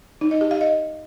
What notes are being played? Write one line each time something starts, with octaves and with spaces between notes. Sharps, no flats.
D#4
D#5
G4
F5
D#5